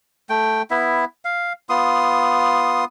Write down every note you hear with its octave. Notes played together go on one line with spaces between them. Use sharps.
A3 G5
B3 E4 E5
F5
B3 F4 C6 D#6